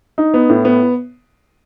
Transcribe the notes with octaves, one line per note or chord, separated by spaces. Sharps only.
D#4
B3
A2
B3